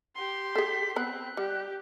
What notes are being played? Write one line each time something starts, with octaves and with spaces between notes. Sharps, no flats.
G4 C6
G#4 A4 B6
B3 C4 B5 F#6
G3 G4